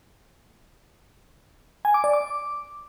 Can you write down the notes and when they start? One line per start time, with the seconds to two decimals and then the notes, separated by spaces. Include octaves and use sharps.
1.85 G#5
1.94 D6
2.04 D5
2.13 D6